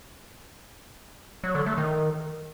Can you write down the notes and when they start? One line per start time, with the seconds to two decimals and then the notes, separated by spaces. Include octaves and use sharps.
1.44 F#3
1.55 D3
1.66 A3
1.78 D#3